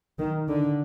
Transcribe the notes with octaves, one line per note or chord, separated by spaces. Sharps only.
D#3
D3